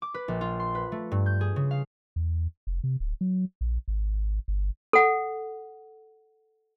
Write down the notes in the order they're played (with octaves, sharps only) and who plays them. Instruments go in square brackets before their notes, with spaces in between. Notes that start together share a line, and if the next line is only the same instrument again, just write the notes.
[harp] D6
B4
A#1
F4
C6
B4
A3
G2
G6
G#4
C#3
F5
[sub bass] E2
F1
C3
D1
F#3
A#1
G#1
G1
[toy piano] A4 F#5